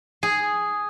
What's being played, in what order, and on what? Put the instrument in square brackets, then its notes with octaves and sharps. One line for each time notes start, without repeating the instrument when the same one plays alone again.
[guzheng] G#4